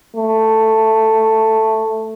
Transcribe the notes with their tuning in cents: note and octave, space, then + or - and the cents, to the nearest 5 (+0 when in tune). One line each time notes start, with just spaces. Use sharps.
A3 +5